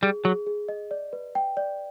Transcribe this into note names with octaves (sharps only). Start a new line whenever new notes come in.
G3 G#4
F#3 G#4
G#4
D#5
D5
B4
G5
D5